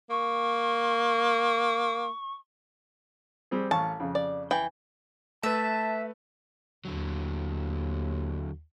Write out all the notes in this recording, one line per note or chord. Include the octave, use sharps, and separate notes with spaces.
A#3 C#6
G3 C4 G#4
A1 F5 A5 C#6
F2 C#3
D5
E3 G5
A3 B4 E5 A5
D#2 D3 F#3